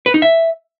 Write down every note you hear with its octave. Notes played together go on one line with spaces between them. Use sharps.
B4
D#4
E5